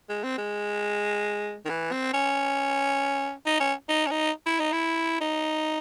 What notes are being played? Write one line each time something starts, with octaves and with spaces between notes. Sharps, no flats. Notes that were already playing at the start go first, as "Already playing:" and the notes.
G#3
C4
G#3
D#3
E3
C4
C#4
D#4
C#4
D#4
C#4
D#4
E4
D#4
E4
D#4